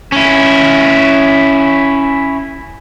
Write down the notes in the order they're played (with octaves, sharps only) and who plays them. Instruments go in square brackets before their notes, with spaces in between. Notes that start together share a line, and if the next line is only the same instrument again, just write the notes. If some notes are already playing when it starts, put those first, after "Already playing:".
[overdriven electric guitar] C#4 E4